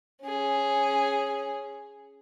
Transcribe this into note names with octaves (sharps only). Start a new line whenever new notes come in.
C#4 G#4